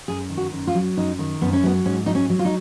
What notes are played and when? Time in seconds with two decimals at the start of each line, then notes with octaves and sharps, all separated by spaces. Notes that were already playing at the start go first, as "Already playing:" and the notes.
0.08 F#2 G#4
0.30 D#3
0.37 F#4
0.52 F#2
0.67 F4
0.75 F#3
0.97 F#2 D#4
1.19 D#3
1.41 F#2 B3
1.53 C#4
1.63 F#3 B3
1.85 G#2 C#4
2.06 F#3 D#4
2.15 C#4
2.30 F#3
2.39 F4
2.45 D#4